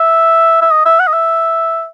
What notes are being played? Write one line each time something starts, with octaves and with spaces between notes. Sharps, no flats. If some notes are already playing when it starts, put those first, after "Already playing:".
Already playing: E5
E5
D#5
E5
F#5
D#5
E5